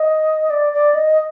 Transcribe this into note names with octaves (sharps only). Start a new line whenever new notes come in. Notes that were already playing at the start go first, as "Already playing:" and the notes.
Already playing: D#5
D5
D5
D#5